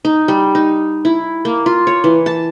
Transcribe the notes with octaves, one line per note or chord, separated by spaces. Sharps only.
D#4
G3
D#4
E4
A#3
F4
C#5
E3
A5